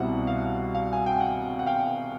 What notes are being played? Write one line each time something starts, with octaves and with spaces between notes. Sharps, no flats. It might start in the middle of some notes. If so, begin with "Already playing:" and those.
Already playing: C2 B2 G3 C4 E4 F#5
F5
F5
G#5
G5
F#5
F#5
F5 G5